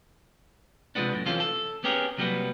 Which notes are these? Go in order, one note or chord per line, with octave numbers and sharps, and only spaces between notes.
C3 F3 F#3 G#3 B3 D4
F#2 A2
E2 C3 E3 C#4 F4 A4
A4
B3 C#4 G4 G#4 A#4
C3 F#3 G3 A#3 B3